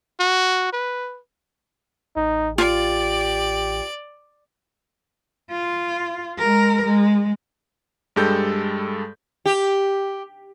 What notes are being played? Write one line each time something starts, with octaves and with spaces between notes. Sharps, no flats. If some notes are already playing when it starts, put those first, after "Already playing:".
F#4
B4
A1 D#4
F4 G4 D5
F4
G#3 A#4
G#3
G2 G3 G#3 G4 A4 G6
G4